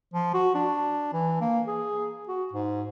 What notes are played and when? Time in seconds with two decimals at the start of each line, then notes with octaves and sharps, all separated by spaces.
0.13 F3
0.34 F#4
0.54 D4
1.13 E3
1.41 A#3
1.66 G#4
2.28 F#4
2.53 G#2